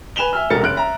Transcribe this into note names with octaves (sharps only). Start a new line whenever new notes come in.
B4 G#5 E7 F7 G7
E5 G#5 E6 F6
E1 C2 A4 A#4 A6 C#7
F#1 F#6 D7
E5 A#5